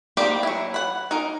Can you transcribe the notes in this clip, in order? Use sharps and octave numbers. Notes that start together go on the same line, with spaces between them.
G3 A#3 C4 D#4 G4
F#3 E4
F#5 B5
D#4 A#4